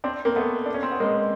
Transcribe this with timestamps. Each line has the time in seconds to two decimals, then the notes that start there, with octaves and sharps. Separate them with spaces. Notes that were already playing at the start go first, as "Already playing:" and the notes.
0.04 C4 D4
0.25 A#3 C4
0.36 A3 B3
0.66 D4
0.74 C#4
0.83 C4
0.92 B3
1.00 G#3 A#3